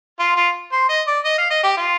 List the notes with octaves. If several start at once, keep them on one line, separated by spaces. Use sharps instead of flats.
F4
F4
C5
D#5
D5
D#5
F5
D#5
G4
F4